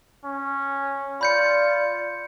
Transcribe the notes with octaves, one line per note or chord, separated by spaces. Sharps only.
C#4
F4 D5 B5 G6 C#7